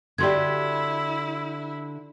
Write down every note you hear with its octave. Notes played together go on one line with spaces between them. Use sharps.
D3 E4 F#4 G4 D5 C6 G#6